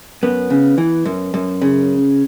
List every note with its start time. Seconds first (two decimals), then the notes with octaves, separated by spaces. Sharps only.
0.23 F#2 B3
0.50 C#3
0.78 E3
1.05 F#2
1.34 F#2
1.62 C#3